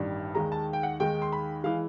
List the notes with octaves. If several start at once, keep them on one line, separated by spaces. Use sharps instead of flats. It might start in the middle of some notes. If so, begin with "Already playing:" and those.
Already playing: A1 G2 D#3 G3
D#2 D#3 G#3 A#5
A5
G5
F#5
D#2 D#3 G#3 G5
C6
B5
E3 G#3 F5